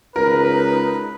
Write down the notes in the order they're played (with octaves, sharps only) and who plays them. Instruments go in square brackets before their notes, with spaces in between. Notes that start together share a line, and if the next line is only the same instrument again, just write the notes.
[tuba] C#2 [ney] D#4 [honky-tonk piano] A#4 [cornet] B4